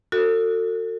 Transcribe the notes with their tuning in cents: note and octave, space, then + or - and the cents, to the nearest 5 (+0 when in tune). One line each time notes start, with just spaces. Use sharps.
F#4 -15 A4 +40